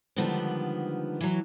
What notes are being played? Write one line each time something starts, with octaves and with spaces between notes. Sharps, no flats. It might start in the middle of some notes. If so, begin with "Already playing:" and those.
D3 D#3 F3 G3 G#3 B3
E3 F#3